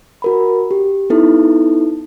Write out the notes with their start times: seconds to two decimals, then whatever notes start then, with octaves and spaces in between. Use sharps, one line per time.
0.22 F#4 A#4 B5
0.71 G4
1.10 B3 D#4 E4 A4